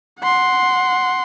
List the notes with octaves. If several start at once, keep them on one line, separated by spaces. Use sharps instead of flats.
F#5 C6